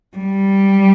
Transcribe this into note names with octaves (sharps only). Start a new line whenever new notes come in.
G3